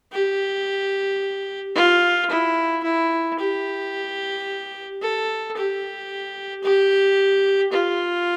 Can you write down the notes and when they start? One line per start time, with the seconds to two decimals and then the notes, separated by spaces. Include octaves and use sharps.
0.12 G4
1.75 F4
2.30 E4
2.83 E4
3.39 G4
5.02 A4
5.56 G4
6.64 G4
7.72 F4